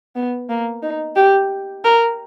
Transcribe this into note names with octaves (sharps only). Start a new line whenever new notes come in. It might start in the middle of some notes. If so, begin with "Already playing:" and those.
B3
A#3
D#4
G4
A#4